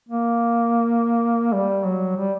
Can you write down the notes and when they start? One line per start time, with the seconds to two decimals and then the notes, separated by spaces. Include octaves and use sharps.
0.09 A#3
1.53 G3
1.84 F#3
2.17 G3